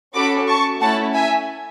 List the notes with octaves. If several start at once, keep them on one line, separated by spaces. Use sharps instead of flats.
C#4 F#4 A4 B5 D6
A5 C#6
A3 C#4 E4 F#5 A5
E5 G#5